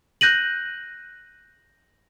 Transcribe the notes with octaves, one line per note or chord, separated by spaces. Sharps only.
F#6 G6 A#6 D#7 F#7